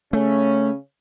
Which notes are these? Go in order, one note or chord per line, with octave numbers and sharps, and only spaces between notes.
C#3 A3 C#4